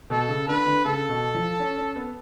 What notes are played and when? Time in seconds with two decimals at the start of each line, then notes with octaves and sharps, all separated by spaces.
0.10 B2 A4
0.28 C#3
0.48 D3 B4
0.66 D3
0.85 C#3 A4
1.09 B2
1.34 F3
1.60 C#4
1.77 C#4
1.96 B3